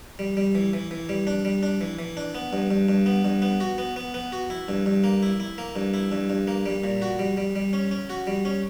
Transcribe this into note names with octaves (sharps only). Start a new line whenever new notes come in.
G3
G3
E3
E3
E3
G3
D4
G3
D4
E3
E3
D4
B3
G2
G2
G2
B3
G2
B3
F#4
B3
B3
B3
F#4
E4
G2
G2
A#3
E4
E4
A#3
G2
E4
G2
G2
A#3
G3
A#2
F#4
G3
G3
G3
C#4
C#4
F#4
G3
C#4